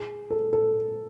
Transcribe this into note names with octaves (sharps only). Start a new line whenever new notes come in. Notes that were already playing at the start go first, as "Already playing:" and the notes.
Already playing: G#4
A4
A4